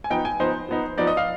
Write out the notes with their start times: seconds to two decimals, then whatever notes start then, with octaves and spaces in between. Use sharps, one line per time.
0.04 G#5
0.10 F3 B3 D#4 G5
0.25 G#5
0.40 F3 B3 D#4 C5
0.69 F3 B3 D#4
0.98 F3 B3 D#4 D5
1.07 D#5
1.17 F5